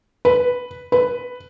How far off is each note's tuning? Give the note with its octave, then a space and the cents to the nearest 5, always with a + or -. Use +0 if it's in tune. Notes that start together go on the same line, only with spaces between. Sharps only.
B4 +0
B4 +5